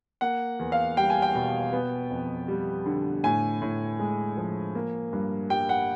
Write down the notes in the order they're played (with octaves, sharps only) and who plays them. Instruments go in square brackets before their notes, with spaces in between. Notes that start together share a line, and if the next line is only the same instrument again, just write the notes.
[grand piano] A#3 F#5
E2
F5
G3 G5
G#5
G5
B2
B3
F2
G3
D3
A2 G#5
A2
G#3
F3
A#3
G2
G3 G5
F#5